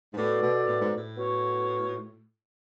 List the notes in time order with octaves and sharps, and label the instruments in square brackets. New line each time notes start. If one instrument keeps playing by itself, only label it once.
[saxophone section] G#2
[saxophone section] A2 [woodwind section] B3 F#4 A4 D5
[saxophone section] B2
A2
G#2
A2
[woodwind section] B3 F#4 C#5